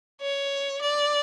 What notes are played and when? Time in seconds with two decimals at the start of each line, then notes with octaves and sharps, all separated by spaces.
0.21 C#5
0.81 D5